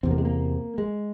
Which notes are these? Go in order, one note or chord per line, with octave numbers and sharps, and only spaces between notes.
E2 C3 C4
A#3
G#3
A#3
G#3